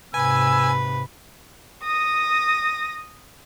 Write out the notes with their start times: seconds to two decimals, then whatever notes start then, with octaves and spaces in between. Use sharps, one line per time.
0.14 G#2 C3 B4 G#5 E6
1.84 D#6 A#6